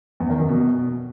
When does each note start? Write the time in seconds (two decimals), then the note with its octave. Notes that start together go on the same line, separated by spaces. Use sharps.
0.20 E2
0.30 D#3
0.39 F#2
0.49 B2